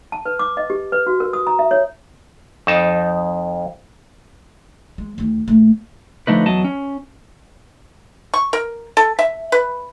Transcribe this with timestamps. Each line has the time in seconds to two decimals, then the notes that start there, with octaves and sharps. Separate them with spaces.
0.12 A5
0.25 B4
0.39 D6
0.57 D#5
0.70 G4
0.92 B4
1.07 F#4
1.20 A#4
1.33 D#6
1.47 A#5
1.59 E5
1.71 C#5
2.67 F2 D#4 A5
4.98 G#3
5.18 D2 D#3
5.48 A#1 A3
6.27 D3 F3 A3 D#4 B4
6.46 E2 F#3 D#5 A5
6.64 C#4
8.34 C#6
8.53 A#4
8.97 A4
9.19 E5
9.52 B4